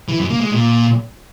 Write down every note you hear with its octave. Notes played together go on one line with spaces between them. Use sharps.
E3
F#2
A#3
G#3
A#2